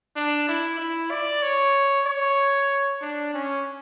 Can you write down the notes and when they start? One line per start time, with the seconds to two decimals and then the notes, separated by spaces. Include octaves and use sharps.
0.16 D4
0.48 E4
0.79 E4
1.11 D5
1.43 C#5
2.06 C#5
3.01 D4
3.34 C#4